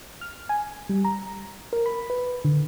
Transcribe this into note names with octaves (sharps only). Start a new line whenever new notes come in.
F6
G#5
G3
A#5
A#4
B5
B4
D3